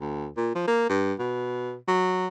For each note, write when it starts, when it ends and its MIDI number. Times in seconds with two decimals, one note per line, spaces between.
0.01 0.29 38
0.37 0.53 46
0.55 0.64 53
0.68 0.87 58
0.89 1.13 43
1.19 1.76 47
1.88 2.27 54